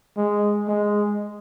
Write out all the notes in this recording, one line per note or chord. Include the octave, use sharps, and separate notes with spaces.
G#3
G#3